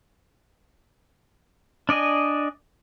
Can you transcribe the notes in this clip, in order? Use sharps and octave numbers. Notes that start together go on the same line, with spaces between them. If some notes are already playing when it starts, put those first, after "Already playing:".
D4 D5 D#5 G#5